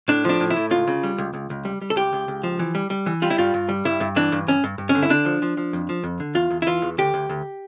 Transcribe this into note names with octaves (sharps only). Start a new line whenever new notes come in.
A2 D4
F3 D4
A2
E4
A2
C#2 F4
C#3
G3
C#2
C#2
C#2
G3
G3
A4
C#2 G4
C#2
C#2
F3
E3
G3
G3
E3
G3 F4
E4
G2 F4
G2
G3
G2 E4
G2
E3 D4
G2
G2 C#4
G2
G2
C#4
D3
E4
D3 D4
F3
F3
F3
F2
F3
F2
D3
E2 F4
E2
E4
E3 F4
E2
D2 G4
D2
D2